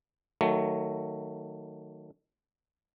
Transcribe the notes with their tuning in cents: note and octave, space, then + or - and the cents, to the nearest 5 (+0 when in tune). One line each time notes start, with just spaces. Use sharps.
D#3 +0 F#3 +0 A3 +15